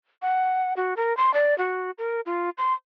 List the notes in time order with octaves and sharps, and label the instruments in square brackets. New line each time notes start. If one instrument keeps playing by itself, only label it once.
[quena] F#5
F#4
A#4
C6
D5
F#4
A#4
F4
C6